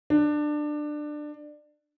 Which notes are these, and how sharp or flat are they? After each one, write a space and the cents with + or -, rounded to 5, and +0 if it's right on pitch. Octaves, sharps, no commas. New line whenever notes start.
D4 +20